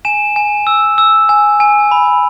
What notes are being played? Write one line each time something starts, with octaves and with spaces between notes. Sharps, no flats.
G#5 E7
G#5
E6
E6
G#5
G#5
B5